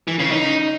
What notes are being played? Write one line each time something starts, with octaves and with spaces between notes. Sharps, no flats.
E3
C#3
D#4